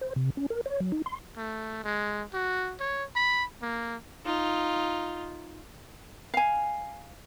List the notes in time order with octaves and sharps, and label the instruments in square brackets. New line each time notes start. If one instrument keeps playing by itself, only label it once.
[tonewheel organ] C5
C3
C#4
A#4
C#5
F#3
D#4
C6
[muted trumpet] A3
G#3
F#4
C#5
B5
A#3
[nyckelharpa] D#4 F4
[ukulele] F5 G#5